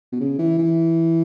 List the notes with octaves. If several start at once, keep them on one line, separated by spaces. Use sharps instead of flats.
B2
C#3
E3
E3